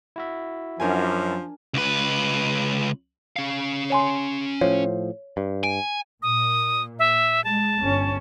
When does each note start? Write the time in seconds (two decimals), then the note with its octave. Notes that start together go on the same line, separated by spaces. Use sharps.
0.16 E4 F#4 E5
0.80 F#2 F3 D4 A#4 G#5
1.74 C#2 B4
3.36 C#4 F5
3.90 C#5 G#5 C6
4.61 A2 F3 C#5
5.37 G2
5.64 G#5 D7
6.22 A#2 D#6
6.99 E5
7.44 G#3 A5
7.79 G1 C#4